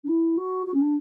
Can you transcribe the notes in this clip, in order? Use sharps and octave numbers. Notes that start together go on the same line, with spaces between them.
D4
E4
F#4
F#4
C#4
D4